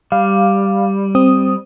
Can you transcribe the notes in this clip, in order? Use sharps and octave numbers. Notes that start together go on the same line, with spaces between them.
G3 F5
C4 D#6